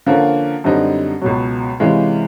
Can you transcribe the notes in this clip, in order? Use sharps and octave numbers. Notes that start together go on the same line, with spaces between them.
D3 F3 A#3 C#4
F#2 D3 G3 C4 D#4
C#2 B2 F#3
C3 E3 G#3 C#4 F4